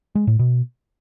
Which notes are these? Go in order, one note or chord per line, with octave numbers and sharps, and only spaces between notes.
G#3
A2
B2